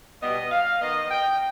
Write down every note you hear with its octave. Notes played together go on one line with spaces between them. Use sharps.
B2 G3 B3 D#5
F5
D#3 B3 D#4 D#5
G5